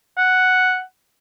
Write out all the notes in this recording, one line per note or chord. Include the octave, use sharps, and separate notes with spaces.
F#5